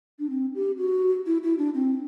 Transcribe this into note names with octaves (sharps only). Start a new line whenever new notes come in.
D4
C4
G4
F#4
E4
E4
D4
C4